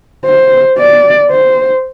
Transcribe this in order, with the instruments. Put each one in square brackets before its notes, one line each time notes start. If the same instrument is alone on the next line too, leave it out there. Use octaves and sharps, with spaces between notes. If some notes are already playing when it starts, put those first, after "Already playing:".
[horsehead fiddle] C5
D5
C5